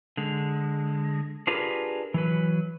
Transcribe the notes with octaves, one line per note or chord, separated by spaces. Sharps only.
D3 G#3
D4 F4 G4 G#4 A#4 B4
E3 F#3 B4